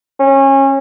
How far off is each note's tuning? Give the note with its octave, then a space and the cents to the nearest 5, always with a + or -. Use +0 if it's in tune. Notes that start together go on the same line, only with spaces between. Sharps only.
C#4 -25